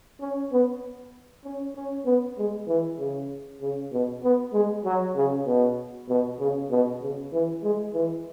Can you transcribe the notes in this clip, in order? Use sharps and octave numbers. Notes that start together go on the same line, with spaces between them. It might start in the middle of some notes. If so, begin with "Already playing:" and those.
C#4
B3
C#4
C#4
B3
G#3
E3
C#3
C#3
B2
B3
G#3
F#3
C#3
B2
B2
C#3
B2
C#3
E3
G#3
E3